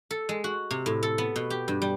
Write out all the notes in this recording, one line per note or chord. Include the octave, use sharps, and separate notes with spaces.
A4
G#3
F#4
C3
A2
A4
B3
B2
G4
G2
G3